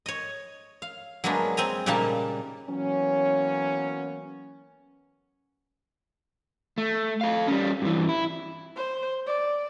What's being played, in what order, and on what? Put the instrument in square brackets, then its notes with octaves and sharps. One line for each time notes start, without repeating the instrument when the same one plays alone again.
[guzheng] C#5 D#5
F5
F#3 G#3 A#3 B3 D4
C4 G#5 A#5
A#2 C#3 G3 A#3 D#4 A5
[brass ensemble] E3 F#3 A#3 B3 C#4
[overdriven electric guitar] A3
A4 F5
G3 C#4
G2 E3
E4
[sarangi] C5
D5